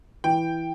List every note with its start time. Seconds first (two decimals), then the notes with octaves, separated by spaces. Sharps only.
0.24 E3 G5